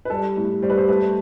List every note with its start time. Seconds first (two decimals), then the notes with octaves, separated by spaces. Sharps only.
0.05 B4
0.10 G3 A4
0.37 A2
0.62 G3 C5
0.70 B4
0.78 C5
0.89 A3 B4